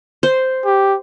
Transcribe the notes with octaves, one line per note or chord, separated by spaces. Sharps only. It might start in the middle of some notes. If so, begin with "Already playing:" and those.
C5
G4